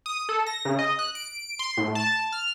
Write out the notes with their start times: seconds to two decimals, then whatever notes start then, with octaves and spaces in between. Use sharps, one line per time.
0.06 D#6
0.29 A4
0.47 A#6
0.65 C#3
0.79 D#5
0.99 F#6
1.15 D7
1.59 C6
1.77 A2
1.95 A5
2.32 F6